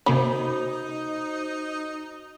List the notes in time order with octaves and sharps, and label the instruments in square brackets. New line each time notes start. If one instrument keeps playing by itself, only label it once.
[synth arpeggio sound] C3 A#3 C#4 [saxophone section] D#4 [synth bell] F#4 C5 [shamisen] B5